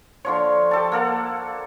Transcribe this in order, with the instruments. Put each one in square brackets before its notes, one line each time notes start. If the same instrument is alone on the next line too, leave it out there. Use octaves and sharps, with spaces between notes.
[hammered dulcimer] D3 F3 C#5
G4 A4 A5
A#3 A4 F#5